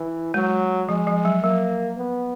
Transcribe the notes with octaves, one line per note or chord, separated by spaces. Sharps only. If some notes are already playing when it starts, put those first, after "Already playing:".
Already playing: E3
F#3 G#3
F3 G#3
F3
F#3
F#3 A#3
B3